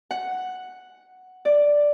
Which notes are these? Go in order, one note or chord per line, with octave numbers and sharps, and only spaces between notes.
F#5
D5